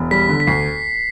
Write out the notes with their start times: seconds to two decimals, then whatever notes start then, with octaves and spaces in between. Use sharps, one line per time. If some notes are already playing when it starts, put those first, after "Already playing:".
Already playing: E1
0.11 G3 B6
0.29 D3
0.40 B6
0.47 D2 C7